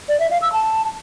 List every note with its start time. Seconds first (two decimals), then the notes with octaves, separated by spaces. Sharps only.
0.09 D5
0.20 E5
0.31 F5
0.42 E6
0.53 A5